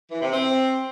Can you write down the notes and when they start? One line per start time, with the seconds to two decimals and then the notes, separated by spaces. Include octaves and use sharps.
0.11 E3
0.22 C3
0.33 C4